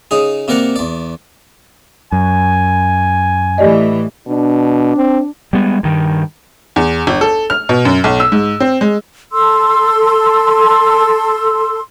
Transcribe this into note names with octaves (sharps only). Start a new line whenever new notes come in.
C#3 D#4 G#4
C3 A#3 A#4 D5 F#5 A#5
E2 D5
F#2 G#5
A2 E3 G4 D5 D#5
B2 D4
C4
G3 G#3 B3
G2 D#3
E2
G1
A4
F6
B2
F#2
B1
E6
G#2
C4
G#3
A4 C6 E6